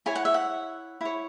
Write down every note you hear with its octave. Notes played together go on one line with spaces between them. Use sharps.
E4 C#5 G#5
F#5
E5
F#5
E4 C#5